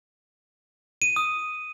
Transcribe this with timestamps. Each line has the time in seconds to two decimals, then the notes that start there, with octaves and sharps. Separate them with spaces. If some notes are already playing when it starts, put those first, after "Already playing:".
1.02 D#7
1.16 D#6